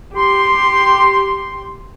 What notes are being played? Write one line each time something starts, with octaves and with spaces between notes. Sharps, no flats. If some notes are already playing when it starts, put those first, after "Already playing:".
G4 C6